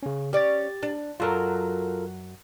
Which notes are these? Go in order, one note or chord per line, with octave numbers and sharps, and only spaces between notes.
C#3 C#4
C#4 G4 D5 A6
D4
F#2 F#3 F4 A4 A#4